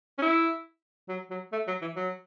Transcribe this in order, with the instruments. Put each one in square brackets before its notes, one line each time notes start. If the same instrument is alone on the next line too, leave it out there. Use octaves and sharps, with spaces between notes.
[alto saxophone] C#4
E4
F#3
F#3
A3
F#3
E3
F#3